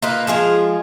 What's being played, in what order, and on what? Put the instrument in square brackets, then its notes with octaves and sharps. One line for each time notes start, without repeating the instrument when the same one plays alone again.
[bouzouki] A#3 D#4 F4 B4
F3 G#3 F4 G#4